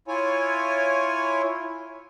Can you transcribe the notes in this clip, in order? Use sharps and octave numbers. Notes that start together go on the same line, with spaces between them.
E4 F4 C#5 G#5